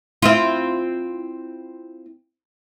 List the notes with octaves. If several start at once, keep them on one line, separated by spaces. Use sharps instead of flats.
C4 E4 F4